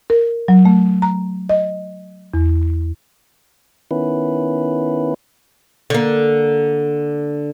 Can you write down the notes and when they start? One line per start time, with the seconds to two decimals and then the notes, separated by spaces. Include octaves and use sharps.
0.10 A#4
0.48 F#3
0.65 A3
1.02 A#5
1.49 D#5
2.34 E2
3.91 D#3 B3 C#4 E4 B4
5.90 D3 A#3